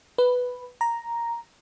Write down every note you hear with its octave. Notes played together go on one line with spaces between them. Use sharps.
B4
A#5